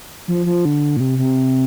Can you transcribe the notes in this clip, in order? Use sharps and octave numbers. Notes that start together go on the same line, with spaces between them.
F3
F3
D3
A#2
C3
C3